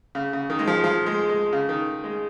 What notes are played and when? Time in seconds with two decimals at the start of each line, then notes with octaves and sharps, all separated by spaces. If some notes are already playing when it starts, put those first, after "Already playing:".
0.15 C#3
0.33 C#3
0.50 D#3
0.59 G#3
0.67 F3
0.84 F3
1.06 G#3
1.29 G#3
1.53 C#3
1.69 D#3
2.04 G#3